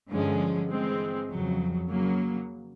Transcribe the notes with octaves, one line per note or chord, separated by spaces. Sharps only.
G2 D3 F3 G#3 C#4
E3 G#3 C4
F2 C#3 F#3
C#3 F#3 A#3